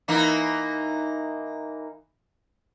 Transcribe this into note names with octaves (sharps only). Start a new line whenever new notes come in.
E3 A#3 D#4